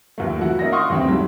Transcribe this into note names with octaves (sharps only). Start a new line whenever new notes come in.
D#2 A#2 A3
E3 E4 F#4 F#5
A#3 C#4 D4 D#5 E5 A#6
F5 F#5 C6 C#6 D#6 F6
D#2 C#3 E3 A3 C4
G#2 F#3 G3 A3